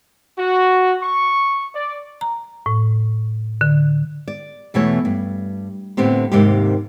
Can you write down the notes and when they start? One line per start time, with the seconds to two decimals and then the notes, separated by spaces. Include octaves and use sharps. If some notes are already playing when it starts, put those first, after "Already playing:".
0.37 F#4
1.01 C#6
1.74 D5
2.21 A#5
2.66 A2
3.61 D3
4.28 D5
4.74 E2 B2 E3 A3 C#5
5.05 G2
5.97 A2 D3 B3 C4 G4
6.32 D#2 G#2 C3 A#3 C4 G4